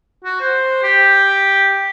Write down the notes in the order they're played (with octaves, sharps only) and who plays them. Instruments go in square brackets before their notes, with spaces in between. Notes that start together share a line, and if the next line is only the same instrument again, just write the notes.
[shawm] F#4
C5
G4